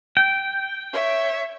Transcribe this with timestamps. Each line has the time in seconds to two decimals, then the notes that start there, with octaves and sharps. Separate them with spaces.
0.17 G5
0.93 C#5 E5